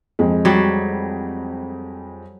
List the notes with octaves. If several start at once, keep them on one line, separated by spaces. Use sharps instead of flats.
F2 G#3
F#3 G3